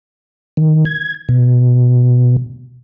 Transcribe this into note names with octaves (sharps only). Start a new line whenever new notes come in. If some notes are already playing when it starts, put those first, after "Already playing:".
D#3
G#6
B2